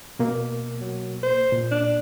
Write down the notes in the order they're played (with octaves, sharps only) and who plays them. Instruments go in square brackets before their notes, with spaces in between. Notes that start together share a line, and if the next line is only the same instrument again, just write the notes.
[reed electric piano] B2 A#3
[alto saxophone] F#3
C5
[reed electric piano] A#2
[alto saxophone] D4